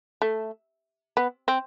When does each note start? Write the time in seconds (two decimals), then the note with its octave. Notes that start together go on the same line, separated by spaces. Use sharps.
0.22 A3
1.17 B3
1.48 C4